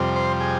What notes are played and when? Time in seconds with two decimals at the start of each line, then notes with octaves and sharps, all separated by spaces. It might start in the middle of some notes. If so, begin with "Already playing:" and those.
Already playing: F2 C3 G3
0.16 C5
0.40 G#4